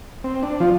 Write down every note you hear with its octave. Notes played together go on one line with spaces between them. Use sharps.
C4
D4
F3 F4